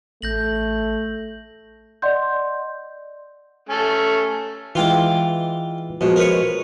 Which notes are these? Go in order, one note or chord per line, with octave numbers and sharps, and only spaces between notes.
A1 A3 G6 A#6 F#7
D5 D#5 F#5 C6 G6
A3 C#4 G#5
E3 G#3 F4 G5 D6
B2 F3 G#3
A#4 B4 C#5